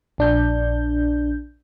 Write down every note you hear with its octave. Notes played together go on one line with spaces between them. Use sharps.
A#1 D4 G6